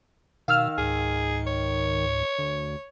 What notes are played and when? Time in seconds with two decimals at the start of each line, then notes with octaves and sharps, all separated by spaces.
0.48 B2 D#3 F5 E6 F6
0.78 C#2 G#2 G#4
1.47 C#5
2.38 D2